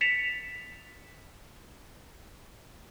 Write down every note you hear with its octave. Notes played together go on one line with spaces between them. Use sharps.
A6 B6 C#7 E7 F7